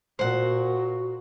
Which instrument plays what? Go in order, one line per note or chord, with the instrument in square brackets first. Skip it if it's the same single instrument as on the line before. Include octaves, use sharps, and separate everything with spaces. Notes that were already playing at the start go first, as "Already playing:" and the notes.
[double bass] A#2 [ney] F#4 [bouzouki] C5 F#5